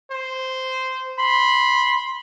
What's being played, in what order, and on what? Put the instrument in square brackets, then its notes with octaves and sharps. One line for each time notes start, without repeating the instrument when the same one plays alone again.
[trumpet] C5
[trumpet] B5 [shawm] C6